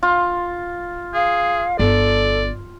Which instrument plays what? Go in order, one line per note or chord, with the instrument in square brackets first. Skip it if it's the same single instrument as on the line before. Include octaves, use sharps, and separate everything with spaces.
[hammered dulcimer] F4
[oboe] G#4 [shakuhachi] F5
[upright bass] G1 [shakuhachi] A4 [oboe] D5